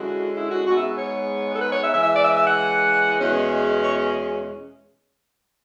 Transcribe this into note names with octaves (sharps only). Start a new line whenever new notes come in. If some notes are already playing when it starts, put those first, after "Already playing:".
Already playing: D3 G#3 C#4 E4 F#4
E4
F#4
G#2 G#3 B3 F#4
E5
C#5
A4
B4
C#5
E5
C#3 E3 G#3 E5
E5
D5
E5
E5
F#5
E2 B2 G#3 C#4
C#5